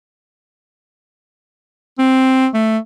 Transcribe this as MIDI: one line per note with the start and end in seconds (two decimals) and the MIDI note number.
1.99 2.47 60
2.54 2.78 57